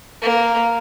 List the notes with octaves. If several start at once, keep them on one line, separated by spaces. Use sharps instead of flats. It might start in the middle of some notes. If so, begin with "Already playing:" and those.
A#3